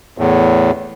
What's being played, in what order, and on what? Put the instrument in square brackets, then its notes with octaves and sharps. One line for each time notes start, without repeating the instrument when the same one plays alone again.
[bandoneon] E2 A2